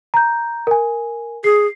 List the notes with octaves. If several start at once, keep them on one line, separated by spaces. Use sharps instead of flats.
A#5 G6
A#4 G#5
G#4 C7